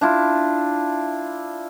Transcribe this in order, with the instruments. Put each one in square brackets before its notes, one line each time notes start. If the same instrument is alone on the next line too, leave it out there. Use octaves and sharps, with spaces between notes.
[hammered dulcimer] D4 E4 F4